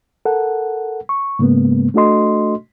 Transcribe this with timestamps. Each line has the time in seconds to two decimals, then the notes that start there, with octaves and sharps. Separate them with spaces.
0.25 A4 A#4 F#5
1.09 C#6
1.39 G#2 C#3 G#3 A#3 B3
1.94 A3 D4 F#4 A4 D#5 C6